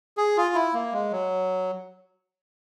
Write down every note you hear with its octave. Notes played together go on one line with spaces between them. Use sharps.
G#4
F4
E4
A#3
G#3
F#3